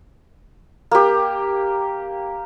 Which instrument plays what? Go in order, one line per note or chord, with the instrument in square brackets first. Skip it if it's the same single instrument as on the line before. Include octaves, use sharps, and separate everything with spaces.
[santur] A#3 G4